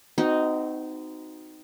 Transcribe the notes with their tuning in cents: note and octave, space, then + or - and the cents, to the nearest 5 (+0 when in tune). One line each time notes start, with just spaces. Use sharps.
C4 -35 D#4 +0 F#4 +0